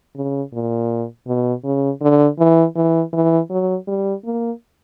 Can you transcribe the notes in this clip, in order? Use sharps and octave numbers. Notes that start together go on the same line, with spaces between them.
C#3
A#2
B2
C#3
D3
E3
E3
E3
F#3
G3
A#3